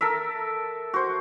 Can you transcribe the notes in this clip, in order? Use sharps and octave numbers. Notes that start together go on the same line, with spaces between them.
A4 A#4 E5
F#4 C5